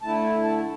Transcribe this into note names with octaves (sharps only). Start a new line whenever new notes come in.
D3 A3 E4 A5
A5